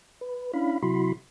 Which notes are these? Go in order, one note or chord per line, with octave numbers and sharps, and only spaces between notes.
B4
C#4 D4 E4 F5 B5
C3 F#3 E4 F#4 B5 C6